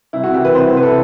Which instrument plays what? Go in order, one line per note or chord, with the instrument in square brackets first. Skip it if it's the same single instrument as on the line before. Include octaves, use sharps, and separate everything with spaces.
[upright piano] C2 E4
F#4
C3 E3 G4
B4
C2 C5
C3 E3 B4
A4